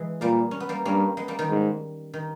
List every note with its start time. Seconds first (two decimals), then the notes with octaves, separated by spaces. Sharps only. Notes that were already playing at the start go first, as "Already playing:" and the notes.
Already playing: E3 G#3
0.21 A#2 G3 A#3
0.51 C#4
0.60 B3
0.69 G3 A#3
0.85 G2 A#3 C#4
1.17 G#3 B3
1.28 G3 A#3
1.39 D#3 G3
1.49 G#2
2.13 D#3